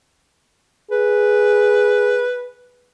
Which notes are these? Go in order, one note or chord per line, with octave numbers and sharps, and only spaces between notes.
G#4 B4